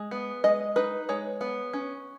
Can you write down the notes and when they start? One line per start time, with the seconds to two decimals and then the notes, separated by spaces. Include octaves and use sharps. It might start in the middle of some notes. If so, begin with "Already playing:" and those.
Already playing: G#3
0.11 B3
0.44 G#3 D#5
0.76 D#4 B4
1.09 G#3 C#5
1.41 B3
1.73 C#4